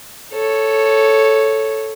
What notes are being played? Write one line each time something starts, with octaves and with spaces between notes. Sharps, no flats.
A4 C#5